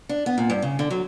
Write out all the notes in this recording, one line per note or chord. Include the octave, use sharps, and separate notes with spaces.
D4
B3
A#2
G2
C#3
D3
F#3